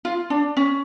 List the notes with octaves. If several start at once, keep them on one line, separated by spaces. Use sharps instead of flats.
F4
D4
C#4